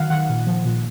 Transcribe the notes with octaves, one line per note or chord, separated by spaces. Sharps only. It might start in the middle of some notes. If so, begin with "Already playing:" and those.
Already playing: D#3 F#3 F5 F#5
D#3 F#5
A#2
F3
A#2